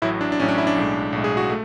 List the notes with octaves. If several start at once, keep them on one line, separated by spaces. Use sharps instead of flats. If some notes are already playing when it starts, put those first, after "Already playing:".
A1 A2 F#3 E4
D4
D4
A1 A2 F#3 C#4
D4
E4
D4
B1 A2 G#3
B1 A2 G#3
G#4
F#4
A3